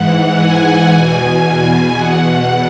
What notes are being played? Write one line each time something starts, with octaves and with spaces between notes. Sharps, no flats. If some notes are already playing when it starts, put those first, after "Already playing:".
Already playing: G#2 E3 F#5
G#5
E2 B2 G#5
E2 B2 F#5